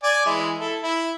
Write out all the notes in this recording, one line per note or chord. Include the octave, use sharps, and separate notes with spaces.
D5 G#5
E3 G#3 E4
E4 A4
E4